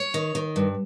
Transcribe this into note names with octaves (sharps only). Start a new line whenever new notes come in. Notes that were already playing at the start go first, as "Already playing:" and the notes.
Already playing: C#5
D#3
D#3
G2